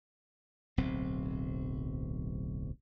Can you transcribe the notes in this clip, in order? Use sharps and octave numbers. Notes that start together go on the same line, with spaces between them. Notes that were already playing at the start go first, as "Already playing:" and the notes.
D1 B1 C4